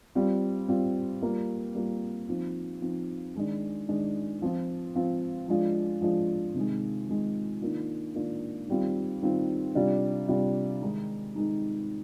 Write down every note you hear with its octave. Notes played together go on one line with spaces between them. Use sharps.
G3 C4 F4
G3 C4 F4
G3 A#3 F4
G3 A#3 F4
F3 C4 D#4
F3 C4 D#4
D#3 G#3 D4
D#3 G#3 D4
F3 C4 F4
F3 C4 F4
F3 G#3 D4 F4
F3 G#3 D4 F4
C3 D#3 G#3
C3 D#3 G#3
D#3 A#3 D4 F4
D#3 A#3 D4 F4
D#3 G3 C4 F4
D#3 G3 C4 F4
C3 G3 D4 F4
C3 G3 D4 F4
D#3 G#3 D#4
D#3 G#3 D#4